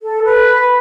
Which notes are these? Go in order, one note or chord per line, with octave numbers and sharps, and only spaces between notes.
A4
B4